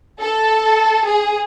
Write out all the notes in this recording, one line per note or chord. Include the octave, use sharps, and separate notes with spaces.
A4
G#4